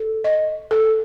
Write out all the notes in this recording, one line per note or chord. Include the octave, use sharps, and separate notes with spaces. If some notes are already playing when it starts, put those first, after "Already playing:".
Already playing: A4
D#5
A4